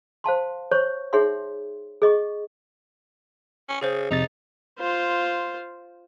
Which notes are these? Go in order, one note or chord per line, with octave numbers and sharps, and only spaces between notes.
C5 F5 A5 C6
C5 C#5 C#6
D#4 G#4 C#5 E5 F#5 C6
G#4 D#5 C#6
C#4
C#3 G#4 C5
F2 C3 D#4 A6
F4 C5